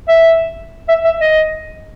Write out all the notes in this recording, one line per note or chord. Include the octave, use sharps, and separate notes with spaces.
E5
E5
E5
D#5